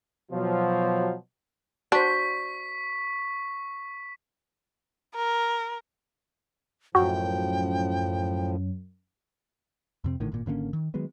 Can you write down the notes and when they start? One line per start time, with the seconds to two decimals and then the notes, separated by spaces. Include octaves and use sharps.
0.31 B2 F3 F#3
1.92 D4 F#4 C5 C#6 B6
5.15 A#4
6.95 F#2 A2 F3 F#4 G5
10.04 F2 C3 C4
10.20 A#1 A2 D3 D#3
10.32 G#1 A#2
10.46 G#1 D3 A#3 C#4
10.73 D#3
10.94 D#3 F#3 G#3 B3